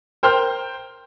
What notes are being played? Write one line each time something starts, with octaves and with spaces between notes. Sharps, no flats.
A#4 C5 G5 C6 F6 G6